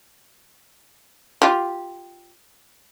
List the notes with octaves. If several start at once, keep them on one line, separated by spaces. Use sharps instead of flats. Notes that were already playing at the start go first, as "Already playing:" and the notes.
F4 G4